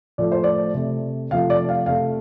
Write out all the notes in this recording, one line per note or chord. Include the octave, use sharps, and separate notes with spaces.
A2 F3 A3 D5
C5
D5
C3 A3
C3 F3 A3 F5
D5
F5
C3 A3 F5